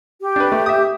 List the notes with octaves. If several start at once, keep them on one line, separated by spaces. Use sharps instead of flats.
G4
D4 B4
A3
E5 D#6